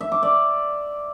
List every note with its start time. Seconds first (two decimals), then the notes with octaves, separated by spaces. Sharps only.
0.01 E5
0.12 D6
0.23 D5